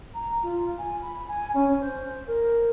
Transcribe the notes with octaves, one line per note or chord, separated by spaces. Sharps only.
A#5
F4
G#5
B5
G#5
C#4
C5
A#4